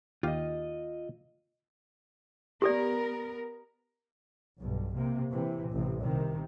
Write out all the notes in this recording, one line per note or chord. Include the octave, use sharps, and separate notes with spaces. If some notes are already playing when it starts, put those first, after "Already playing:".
D#2 F4 G4 D#5 F5
B3 G4 A4 A#4 D5
B1 G2
C3 A#3
C3 E3
A1 C3
C2 C3 D#3